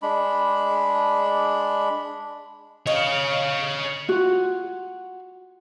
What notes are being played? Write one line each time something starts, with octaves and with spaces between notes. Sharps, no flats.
G#3 D4 B5
C#5 D#5 F5
F4 F#4